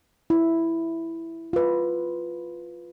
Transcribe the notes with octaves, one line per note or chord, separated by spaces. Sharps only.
E4
F4 B4